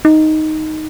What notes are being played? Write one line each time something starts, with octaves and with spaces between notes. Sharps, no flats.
D#4